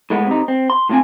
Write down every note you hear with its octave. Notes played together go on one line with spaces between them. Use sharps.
A2 G#3 B3
C3 D#4
C4
C6
A2 C3 F3 C4 G#5